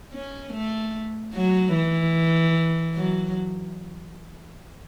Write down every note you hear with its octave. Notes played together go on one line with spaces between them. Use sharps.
C#4
A3
F#3
E3
F#3